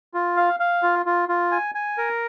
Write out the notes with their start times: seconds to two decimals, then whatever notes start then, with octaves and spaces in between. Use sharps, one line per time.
0.14 F4
0.37 F5
0.60 F5
0.83 F4
1.06 F4
1.29 F4
1.52 G#5
1.75 G#5
1.98 A#4